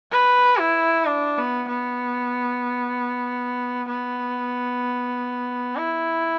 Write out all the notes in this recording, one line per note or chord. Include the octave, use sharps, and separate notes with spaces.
B4
E4
D4
B3
B3
B3
E4